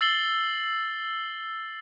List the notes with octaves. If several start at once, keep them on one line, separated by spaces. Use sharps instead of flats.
E6 A6 C7 F#7 G7